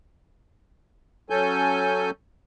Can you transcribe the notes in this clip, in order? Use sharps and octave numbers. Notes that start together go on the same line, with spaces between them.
F#3 C#4 A4 G#5 G6